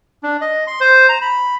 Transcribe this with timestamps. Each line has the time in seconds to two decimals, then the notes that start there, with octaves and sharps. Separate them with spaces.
0.23 D4
0.41 D#5
0.67 C6
0.80 C5
1.09 A#5
1.21 B5